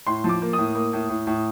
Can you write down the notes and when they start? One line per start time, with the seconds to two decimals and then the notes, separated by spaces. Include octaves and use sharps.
0.07 A2 C6
0.24 F3
0.29 D6
0.42 A#3
0.53 A2 D#6
0.75 A#3
0.93 A2
1.09 A2
1.27 A2